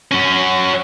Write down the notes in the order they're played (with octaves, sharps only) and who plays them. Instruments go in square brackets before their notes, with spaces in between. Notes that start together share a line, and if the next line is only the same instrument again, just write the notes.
[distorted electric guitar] F#3 C#4